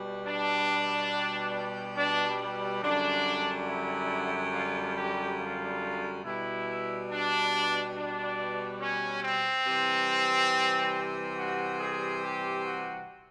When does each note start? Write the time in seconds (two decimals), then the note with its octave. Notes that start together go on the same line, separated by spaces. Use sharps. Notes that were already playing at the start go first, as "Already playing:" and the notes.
Already playing: B2 G3
0.26 D4
1.97 D4
2.83 F#2 D3 G3 D4
3.67 E4
4.54 F4
4.96 G4
5.39 F4
6.24 B2 G3 E4
7.10 D4
7.95 D4
8.81 C#4
9.23 C4
9.66 C3 E3 G3
11.37 F#4
11.79 G#4
12.22 G4
12.65 F#4